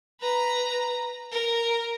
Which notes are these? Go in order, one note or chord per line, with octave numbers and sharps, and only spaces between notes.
B4 A#5
A#4